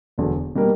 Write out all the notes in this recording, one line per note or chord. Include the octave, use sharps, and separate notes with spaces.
E1 E2 D3 F#3
B2 G3 A#3 D4 A#4